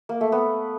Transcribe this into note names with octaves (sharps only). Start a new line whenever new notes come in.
A#3
A3
B3